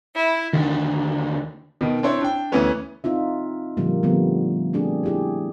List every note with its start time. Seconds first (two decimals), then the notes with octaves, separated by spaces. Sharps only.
0.15 E4
0.53 D#2 D3 D#3
1.81 B2 D#3
2.03 C4 D4 E4 C5 C#5
2.22 D4 G5
2.52 D2 E3 B3 C#4 B4
3.04 C4 D#4 F4 E5
3.77 A#2 D3 F3 G3 A#3
4.03 D3 F3 G3 A3 B3
4.73 A3 C4 D4 G4 G#4
5.03 E4 G4 G#4